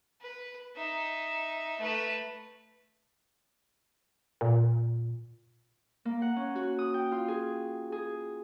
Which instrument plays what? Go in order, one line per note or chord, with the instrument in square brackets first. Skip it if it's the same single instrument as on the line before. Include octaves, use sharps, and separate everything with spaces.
[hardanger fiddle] B4
D#4 E5
A3 B4
[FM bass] A#2
[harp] A#3
F#5
C#4
F#4
D#6
G5
F4
G#4
G#4